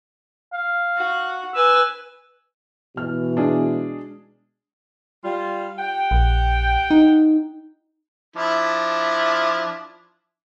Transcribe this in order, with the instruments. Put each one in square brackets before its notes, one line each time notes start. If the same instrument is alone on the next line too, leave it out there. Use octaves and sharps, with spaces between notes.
[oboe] F5
[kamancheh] F#4 F#5
[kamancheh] B4 G#5 [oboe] E6
[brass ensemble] B2 E3 [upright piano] F6
[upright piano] G#3 D4 G#4
[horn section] G3 F4
G4 F#5 G5
[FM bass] A#1
D#4
[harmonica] F3 D4 E4